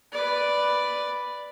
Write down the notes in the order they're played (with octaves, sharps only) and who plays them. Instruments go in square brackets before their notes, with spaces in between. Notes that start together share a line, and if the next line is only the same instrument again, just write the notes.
[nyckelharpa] B4 D5